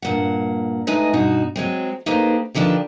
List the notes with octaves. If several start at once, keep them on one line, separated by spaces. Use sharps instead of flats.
G2 A#2 F#5
A2 G#3 D#4 B4 D#5 G#5
G2 B2 D#4 F#4
F#3 G#3 C4
A#3 D#4 G4 A4 B4 C5
D3 D#3 F3 D4 G4 B4